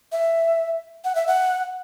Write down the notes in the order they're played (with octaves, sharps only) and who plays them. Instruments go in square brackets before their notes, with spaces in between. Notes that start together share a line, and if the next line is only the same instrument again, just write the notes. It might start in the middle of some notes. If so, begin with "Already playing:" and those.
[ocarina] E5
F#5
E5
F#5